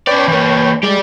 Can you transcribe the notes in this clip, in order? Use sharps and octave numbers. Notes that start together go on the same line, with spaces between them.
C#4 B4 C#5 D5 G5
E3 A#3
G3 G#3 G4 D5